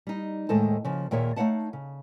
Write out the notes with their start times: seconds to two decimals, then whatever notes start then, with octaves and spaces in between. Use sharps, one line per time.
0.07 G3 D#4
0.49 D#2 A2 G#3 A4 C5 A5
0.85 C#3 F3
1.11 D#2 A#2 A#3 G#4 C#5 E5
1.36 A3 D#4 C#5 F5 F#5 A5
1.73 C#3